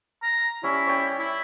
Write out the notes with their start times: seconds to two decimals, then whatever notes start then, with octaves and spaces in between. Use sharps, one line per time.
0.23 A#5
0.63 G3 C#4 E4
0.87 C#5 D5 G5
1.19 E4